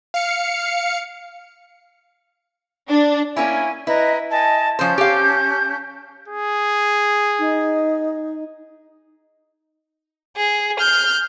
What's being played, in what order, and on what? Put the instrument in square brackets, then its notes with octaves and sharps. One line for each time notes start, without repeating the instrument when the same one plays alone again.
[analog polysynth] F5 C#7
[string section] D4
[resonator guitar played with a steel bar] A#3 C#4 E4 [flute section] G#5
[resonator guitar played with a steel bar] E4 [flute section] B4 D#5 A#5
[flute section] D#5 G#5 A5
[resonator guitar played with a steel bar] F3 C5 [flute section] C#4 A5 G6
[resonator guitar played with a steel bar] G4 F5
[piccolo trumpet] G#4
[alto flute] D#4
[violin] G#4
F6 G6